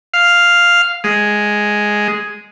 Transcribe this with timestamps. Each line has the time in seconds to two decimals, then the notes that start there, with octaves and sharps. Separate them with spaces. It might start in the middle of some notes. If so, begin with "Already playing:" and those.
0.14 F5
1.04 G#3